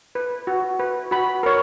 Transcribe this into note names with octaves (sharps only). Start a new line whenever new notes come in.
B4
F#4
B4
F#4 B5
A#4 C#5